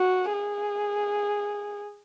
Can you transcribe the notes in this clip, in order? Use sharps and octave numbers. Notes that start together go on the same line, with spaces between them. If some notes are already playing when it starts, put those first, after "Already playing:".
Already playing: F#4
G#4